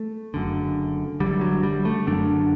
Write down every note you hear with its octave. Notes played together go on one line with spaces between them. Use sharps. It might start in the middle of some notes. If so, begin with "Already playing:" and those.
Already playing: A3
F#1 F#2 D3
F#1 F#2 D3 G3
F#3
G3
A3
F#1 F#2 D3 D4